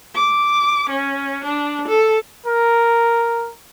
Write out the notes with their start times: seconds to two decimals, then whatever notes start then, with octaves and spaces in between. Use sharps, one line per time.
0.15 D6
0.90 C#4
1.44 D4
1.88 A4
2.46 A#4